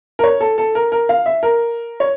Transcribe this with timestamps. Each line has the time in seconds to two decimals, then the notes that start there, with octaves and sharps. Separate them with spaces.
0.19 A#4
0.24 C#5
0.41 A4
0.58 A4
0.75 A#4
0.92 A#4
1.09 F5
1.26 E5
1.43 A#4
2.00 C#5